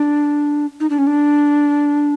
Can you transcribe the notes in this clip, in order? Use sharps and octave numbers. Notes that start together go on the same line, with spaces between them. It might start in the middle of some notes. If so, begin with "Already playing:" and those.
Already playing: D4
D#4
D4
C#4
D4